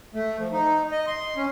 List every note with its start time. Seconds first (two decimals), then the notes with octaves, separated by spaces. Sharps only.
0.14 A3
0.39 F3
0.52 D#4
0.92 D#5
1.07 C6
1.37 C#4